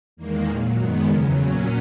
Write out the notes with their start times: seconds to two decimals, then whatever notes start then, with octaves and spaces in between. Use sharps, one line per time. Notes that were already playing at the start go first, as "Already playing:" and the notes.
0.17 E2 D#3 G#3 A#3
0.47 A#2 F#3
0.76 F#2 D#3 G#3 B3
1.06 E2 C#3 F#3
1.37 A#2 F#3 C#4